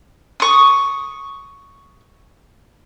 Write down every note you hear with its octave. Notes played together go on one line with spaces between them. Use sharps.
C#6 D#6